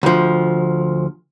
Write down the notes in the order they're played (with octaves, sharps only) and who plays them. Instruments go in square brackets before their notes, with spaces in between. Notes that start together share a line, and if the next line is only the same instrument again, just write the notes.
[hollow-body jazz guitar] D2 F3